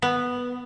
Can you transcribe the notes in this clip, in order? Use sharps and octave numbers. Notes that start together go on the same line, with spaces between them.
B3